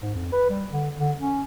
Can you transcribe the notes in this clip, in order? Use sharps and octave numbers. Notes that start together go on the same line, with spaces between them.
G#2
F2
B4
G3
D3
D3
C#4